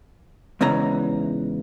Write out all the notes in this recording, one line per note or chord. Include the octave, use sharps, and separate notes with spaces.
E2 G#2 C#3 E3 A#5